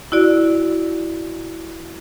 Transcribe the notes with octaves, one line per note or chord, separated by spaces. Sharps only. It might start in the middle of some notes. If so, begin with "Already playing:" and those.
E4 F#4 D5